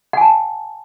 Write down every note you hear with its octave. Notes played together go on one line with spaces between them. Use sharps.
F#5 G#5 A5